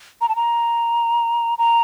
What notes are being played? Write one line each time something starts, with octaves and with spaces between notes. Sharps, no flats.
A#5
A5
A#5
A#5